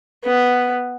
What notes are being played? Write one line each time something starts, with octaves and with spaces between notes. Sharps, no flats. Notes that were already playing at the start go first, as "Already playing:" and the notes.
B3